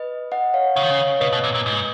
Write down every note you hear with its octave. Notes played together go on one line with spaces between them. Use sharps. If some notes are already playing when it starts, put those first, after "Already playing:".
Already playing: B4 D#5
D#5 F#5
C#5 F5
C#3 C#5 F5
D#3
C#3
B2 B4 D#5
B2
A#2
A#2
G#2